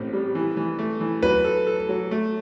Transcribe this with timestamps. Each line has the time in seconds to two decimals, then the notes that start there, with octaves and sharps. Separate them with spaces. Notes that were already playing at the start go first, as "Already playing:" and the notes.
Already playing: A1 A2 C4
0.13 G3
0.35 E3
0.57 E3
0.79 A3
1.01 E3
1.23 F#3 B4
1.44 A4
1.67 A4
1.89 F#3
2.11 A3